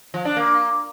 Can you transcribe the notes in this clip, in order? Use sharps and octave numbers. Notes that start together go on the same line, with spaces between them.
F3
D4
A#3